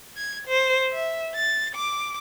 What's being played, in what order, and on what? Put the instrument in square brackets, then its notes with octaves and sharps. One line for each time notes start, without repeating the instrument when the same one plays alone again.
[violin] G#6
C5
E5
A6
D6